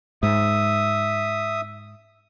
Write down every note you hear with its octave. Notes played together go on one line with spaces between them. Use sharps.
G#2 E5 D#6